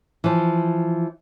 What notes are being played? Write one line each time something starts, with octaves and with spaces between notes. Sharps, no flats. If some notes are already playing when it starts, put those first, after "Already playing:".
E3 F3